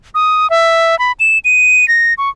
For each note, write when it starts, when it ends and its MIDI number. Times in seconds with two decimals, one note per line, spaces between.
0.15 0.50 87
0.50 0.98 76
0.99 1.12 83
1.20 1.39 100
1.45 1.88 99
1.88 2.14 94
2.18 2.30 85